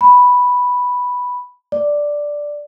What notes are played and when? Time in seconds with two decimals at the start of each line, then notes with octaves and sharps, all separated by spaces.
0.01 B5
1.72 D5